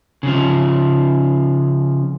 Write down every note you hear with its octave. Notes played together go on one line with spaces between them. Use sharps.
C#3 F3